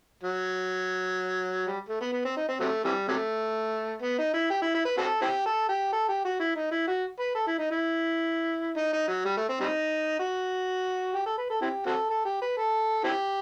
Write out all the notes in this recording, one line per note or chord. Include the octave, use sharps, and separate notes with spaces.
F#3
G3
A3
B3
B3
C4
D#4
C4
C3 F#3 A3
C3 E3 G3
C3 F#3 A3
B3
D#4
E4
G4
E4
E4
B4
C4 F#4 A4
C4 E4 G4
A4
G4
A4
G4
F#4
E4
D#4
E4
F#4
B4
A4
E4
D#4
E4
D#4
D#4
F#3
G3
A3
C4
G3 C4 D#4
F#4
G4
A4
B4
A4
C4 E4 G4
C4 F#4 A4
A4
G4
B4
A4
C4 E4 G4